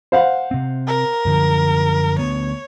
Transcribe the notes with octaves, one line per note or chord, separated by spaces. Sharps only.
C5 F5 F#5
C3 C4
A#4
F#2 D3 F3
D2 B3 C#5